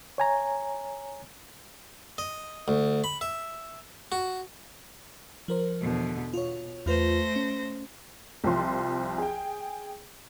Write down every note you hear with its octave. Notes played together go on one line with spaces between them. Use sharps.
C#5 G#5 A#5
D#5
D2
B5
E5
F#4
F3 A#4 C5
E2 B2 D3
B2 F4 C#5
E2 A3 F4 B4 C5 A#6
C#4
C2 F3 C6
G#4 G5